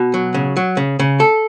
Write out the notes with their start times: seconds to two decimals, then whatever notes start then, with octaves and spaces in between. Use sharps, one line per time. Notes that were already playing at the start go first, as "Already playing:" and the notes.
Already playing: B2
0.14 F#3
0.34 C#3
0.57 F#3
0.77 C#3
0.99 C#3
1.20 A4